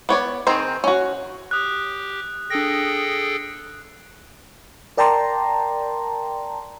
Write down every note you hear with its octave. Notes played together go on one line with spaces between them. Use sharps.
B3 C#5 D5
D#3 C4 G#4 A#5
C#4 F#4
G4 D#6 F#6
D4 G#4 A4 G5 A#6
A#4 D5 G5 A5 A#5 C6